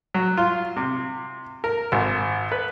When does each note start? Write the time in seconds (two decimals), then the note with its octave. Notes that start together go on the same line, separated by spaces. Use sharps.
0.14 F#3
0.37 F4
0.77 C3
1.64 A#4
1.92 G#1
2.52 B4